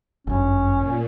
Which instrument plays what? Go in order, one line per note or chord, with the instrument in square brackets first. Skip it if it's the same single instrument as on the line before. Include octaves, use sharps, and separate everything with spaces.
[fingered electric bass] G1 F#2 [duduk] C#4
[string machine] A#2